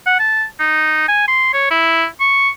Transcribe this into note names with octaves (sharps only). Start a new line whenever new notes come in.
F#5
A5
D#4
G#5
C6
C#5
E4
C#6